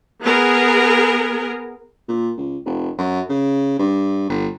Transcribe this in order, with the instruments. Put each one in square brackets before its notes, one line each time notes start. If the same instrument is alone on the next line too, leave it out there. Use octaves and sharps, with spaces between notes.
[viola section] B3 G#4 A#4
[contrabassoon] A#2
C#2
F1
F#2
C#3
G2
G1